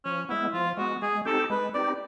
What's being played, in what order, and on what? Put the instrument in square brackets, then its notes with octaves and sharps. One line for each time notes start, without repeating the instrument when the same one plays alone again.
[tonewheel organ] F3 [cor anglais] C#4
[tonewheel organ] G#3 B3 [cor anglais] E4
[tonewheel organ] F3 [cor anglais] F4
[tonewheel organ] G#3 B3 [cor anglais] F#4
[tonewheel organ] G#3 [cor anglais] G#4
[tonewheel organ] C4 D#4 G4 [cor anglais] A4
[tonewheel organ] G#3 [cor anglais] B4
[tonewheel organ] C4 D#4 G4 [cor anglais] D5